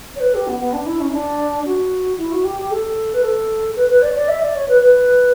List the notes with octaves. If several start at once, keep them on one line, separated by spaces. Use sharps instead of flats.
C#5
B4
G4
B3
B3
D4
E4
C#4
E4
D4
F#4
E4
F#4
G4
G4
A4
B4
A4
B4
B4
D5
C#5
D5
E5
D5
C#5
B4
B4